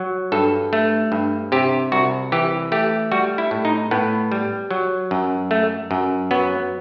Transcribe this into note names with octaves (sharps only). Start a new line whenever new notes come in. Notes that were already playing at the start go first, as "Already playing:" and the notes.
Already playing: F#3
G2 A4
A3
G2
C3 G4
C2 F#4
E3 G4
A3 G4
G3 F#4
E4
A2
D#4
A2 B3
G3
F#3
F#2
A3
F#2
F#3 B3